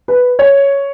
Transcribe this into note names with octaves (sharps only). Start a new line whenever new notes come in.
B4
C#5